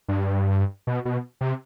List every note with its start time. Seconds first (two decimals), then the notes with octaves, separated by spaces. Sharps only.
0.08 G2
0.87 B2
1.05 B2
1.41 C3